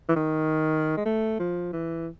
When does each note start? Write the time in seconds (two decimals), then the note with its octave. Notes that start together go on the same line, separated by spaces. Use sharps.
0.09 E3
0.16 D#3
0.97 G#3
1.06 A3
1.40 F3
1.73 E3